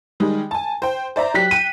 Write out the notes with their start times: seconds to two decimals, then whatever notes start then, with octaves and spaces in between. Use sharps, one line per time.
0.20 D#3 G3 G#3 D#4
0.51 G#5 A5
0.82 C5 G5
1.16 C5 D5 E5 A#5
1.34 F#3 G4 F#6 B6
1.51 G5 D#7